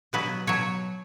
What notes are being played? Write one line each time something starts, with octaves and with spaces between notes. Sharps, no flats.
B2 F#3 B3 B4
B2 F#3 C#5